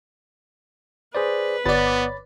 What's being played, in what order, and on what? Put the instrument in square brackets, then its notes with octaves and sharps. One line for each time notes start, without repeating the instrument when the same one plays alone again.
[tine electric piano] G#4 C5 D5 [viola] B4
[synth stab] G1 D5 [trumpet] B3 [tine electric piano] C#5 B5 A6